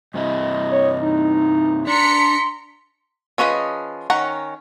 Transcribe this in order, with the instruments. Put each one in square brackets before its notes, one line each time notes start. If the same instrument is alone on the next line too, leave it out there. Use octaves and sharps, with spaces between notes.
[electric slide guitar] G2 C3 E4 [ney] D#5
[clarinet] C#5
D#4
[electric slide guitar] D4 [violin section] A#5 B6 C#7 [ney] C6
[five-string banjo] F3 C#4 G#4 B4 D#5
D#3 C#4 F#5 A#5